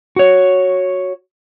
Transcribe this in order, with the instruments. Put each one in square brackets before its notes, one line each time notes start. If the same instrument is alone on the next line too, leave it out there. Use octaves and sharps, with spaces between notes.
[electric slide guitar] F#4 C#5